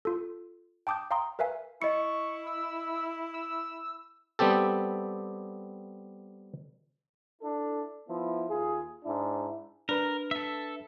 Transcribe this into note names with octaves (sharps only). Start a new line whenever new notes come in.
F4 A4
G5 A5 D6 D#6 G6
F5 G5 A#5 C6 D#6
A#4 B4 E5 F5 G#5
E4 D#5 C#6 C#7
E6
E6
G3 B3 C4 G4 A4
D4 E4 A4
F3 B3 E4
D#2 F4 G#4
G#2 D4 E4
D4 A#4 B4
A4 E5